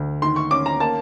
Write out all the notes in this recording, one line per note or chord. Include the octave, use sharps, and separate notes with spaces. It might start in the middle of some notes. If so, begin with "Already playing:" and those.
Already playing: D2
D#3 C6
C#6
C#4 D6
A#5
A#3 A5